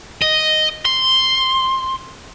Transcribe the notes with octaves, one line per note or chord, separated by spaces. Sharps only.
D#5
C6